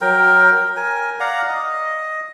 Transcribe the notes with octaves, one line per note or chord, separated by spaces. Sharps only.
F#3 A#4 G5
A#4 G#5
D5 F5 F#5 A#5
D#5